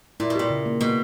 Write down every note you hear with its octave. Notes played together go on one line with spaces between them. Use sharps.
A#2 E4
B2
A#2 G4
C#3
A#3
B2 A#3